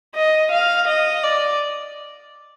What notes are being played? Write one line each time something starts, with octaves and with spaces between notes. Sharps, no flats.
D#5
F5
D#5
D5